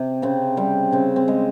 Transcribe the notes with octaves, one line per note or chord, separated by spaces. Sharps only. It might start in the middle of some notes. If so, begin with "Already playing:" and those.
Already playing: C3
C#3 C4
G3 C4
C#3 C4
C4
G#3